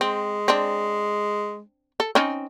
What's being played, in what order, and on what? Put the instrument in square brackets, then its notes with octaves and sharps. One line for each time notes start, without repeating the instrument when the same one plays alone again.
[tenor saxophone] G#3 [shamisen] C4
[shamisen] C4 D4
A4
C4 C#4 D#4